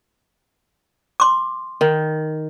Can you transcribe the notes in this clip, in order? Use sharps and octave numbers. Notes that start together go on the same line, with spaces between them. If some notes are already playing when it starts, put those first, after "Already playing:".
C6 D6
D#3